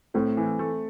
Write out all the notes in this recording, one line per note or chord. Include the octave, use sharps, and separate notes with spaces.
A2 A3 C4
E3
A3